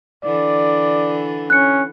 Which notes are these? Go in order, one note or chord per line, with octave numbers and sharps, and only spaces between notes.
D3 E3 D5
C#4 F#6 C#7